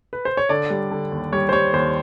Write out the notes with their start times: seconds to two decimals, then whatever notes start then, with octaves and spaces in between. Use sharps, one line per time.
0.13 B4
0.25 C5
0.37 C#5
0.49 D3 D5
0.70 G3
0.91 D3
1.12 D#2
1.32 G3 C#5
1.49 C5
1.53 G3 C#5
1.73 D#2 C5